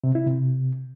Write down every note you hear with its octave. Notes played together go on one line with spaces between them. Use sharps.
C3
E4
C3